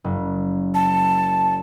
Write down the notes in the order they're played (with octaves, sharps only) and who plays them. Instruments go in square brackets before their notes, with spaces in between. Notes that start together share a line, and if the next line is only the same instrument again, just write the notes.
[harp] F#1
[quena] A5